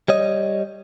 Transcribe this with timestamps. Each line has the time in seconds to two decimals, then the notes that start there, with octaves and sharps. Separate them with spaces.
0.08 G3 C#5 D#5